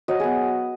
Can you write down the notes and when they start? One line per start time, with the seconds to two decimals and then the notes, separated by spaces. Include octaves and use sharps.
0.08 F#3 D#5
0.20 B3 G#4